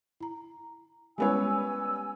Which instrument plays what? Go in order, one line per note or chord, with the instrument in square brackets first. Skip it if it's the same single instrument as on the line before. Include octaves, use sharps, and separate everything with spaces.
[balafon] E4 A#5
[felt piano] G3 B3 C#5 [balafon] G#3 C#4 E4 [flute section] G#5 E6